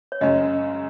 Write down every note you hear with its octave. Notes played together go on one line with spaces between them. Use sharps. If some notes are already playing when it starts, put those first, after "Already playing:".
C#5
F#2 C#3 G#3 C#4 D#5